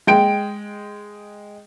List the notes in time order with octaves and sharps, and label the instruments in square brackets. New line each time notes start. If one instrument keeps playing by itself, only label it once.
[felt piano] G#3 G5 D7